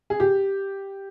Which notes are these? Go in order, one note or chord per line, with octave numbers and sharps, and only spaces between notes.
G#4
G4